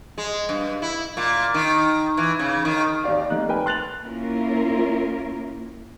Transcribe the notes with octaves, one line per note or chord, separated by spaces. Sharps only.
G#3
G2
E4
A#2
D#3
E3
C#3
D#3
D#2 D#3 D5 F5
F1 A#3 D#4 F#6
A#4 B4 G5 G#5 A#5
C6 F#6 A6 F7 F#7
A#3 C#4 E4 F4 A#4